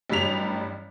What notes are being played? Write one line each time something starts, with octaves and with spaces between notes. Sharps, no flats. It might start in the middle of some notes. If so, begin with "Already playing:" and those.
A1 G2 F#3 G3 B6 F7